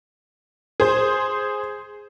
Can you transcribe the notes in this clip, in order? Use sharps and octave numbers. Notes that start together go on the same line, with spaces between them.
G#4 C5